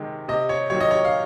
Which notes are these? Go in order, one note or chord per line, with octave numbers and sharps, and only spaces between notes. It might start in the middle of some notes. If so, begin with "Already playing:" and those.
Already playing: C3 D#3 G#3
C3 D#5
C#5
D#3 F#3 C#5
D#5
C#5
F5